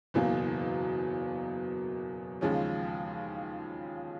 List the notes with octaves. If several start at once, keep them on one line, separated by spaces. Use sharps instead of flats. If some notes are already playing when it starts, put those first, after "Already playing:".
F#1 E2 B2 F#3 A#3
D#2 C#3 F3 G#3 C#4